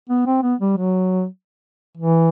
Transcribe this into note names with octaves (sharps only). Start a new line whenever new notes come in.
B3
C4
B3
G3
F#3
E3